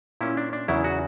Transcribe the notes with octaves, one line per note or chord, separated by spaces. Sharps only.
A#2 A#3 C#4 E4
D4
D4
E2 C#3 F#3 E4
F#4